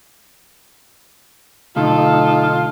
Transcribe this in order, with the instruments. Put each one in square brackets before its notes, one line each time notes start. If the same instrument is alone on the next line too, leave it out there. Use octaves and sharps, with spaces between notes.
[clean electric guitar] B1 D3 A3 [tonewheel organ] D#4 [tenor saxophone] F4 [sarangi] A4